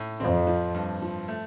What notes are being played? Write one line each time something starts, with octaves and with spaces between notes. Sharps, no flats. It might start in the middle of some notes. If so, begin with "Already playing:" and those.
Already playing: A2
F2 C4
F3
G2
F3
A3